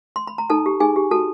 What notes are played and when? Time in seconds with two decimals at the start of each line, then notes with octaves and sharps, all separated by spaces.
0.16 C6
0.27 B5
0.38 A#5
0.50 D#4 A4 A5
0.66 G4
0.80 D#4 G#4 G#5
0.96 G4
1.11 F#4 A4 A5